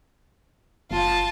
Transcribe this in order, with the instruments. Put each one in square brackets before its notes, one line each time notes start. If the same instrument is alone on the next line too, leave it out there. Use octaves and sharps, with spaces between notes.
[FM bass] F#1 [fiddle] F4 A5